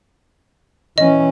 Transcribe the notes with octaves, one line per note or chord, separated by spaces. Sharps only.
E3 C#4 D#5